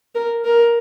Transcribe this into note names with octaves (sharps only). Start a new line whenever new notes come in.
A#4
A#4